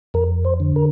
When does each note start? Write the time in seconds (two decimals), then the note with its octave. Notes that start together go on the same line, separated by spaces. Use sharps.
0.14 F2 A#4
0.45 C5
0.60 D3
0.76 A#4